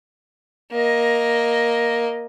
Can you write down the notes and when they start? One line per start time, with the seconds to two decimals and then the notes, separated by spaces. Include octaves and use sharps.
0.72 A#3 D#5